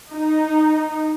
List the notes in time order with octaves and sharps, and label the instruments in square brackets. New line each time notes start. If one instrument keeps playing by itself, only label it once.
[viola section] D#4